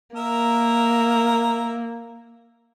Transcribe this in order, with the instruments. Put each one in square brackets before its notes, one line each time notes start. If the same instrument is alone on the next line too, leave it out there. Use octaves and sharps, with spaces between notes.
[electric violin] A#3 [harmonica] A#4 E5 A#5